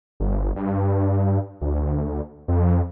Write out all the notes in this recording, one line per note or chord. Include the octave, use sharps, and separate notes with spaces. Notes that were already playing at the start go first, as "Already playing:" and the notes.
G1
G2
D2
F2